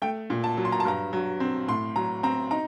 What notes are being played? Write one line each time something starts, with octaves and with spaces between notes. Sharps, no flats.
A3 G5
A#2
A5
F#3
C6
A#5
A5
G2 A#5
F#3
C4
A2 C6
F#3 A#5
C4 A#5
D#4 A#5